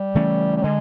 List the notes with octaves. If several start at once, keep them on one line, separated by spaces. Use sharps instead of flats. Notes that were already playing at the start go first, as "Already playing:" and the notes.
Already playing: G3
C#3 E3 A3 C#4
G3
D3 G#3